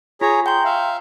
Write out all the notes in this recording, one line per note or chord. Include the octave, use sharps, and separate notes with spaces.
F4 G#4 C#5 A#5
G5 A#5 C6 G6
E5 F5